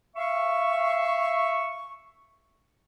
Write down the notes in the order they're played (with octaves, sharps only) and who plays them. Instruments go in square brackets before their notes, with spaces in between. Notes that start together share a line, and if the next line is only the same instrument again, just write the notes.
[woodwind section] E5 F5 C#6